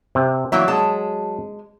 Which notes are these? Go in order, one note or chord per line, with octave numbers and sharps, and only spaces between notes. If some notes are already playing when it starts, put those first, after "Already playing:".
C3
E3 F#3 A#3 E5
G#3 A5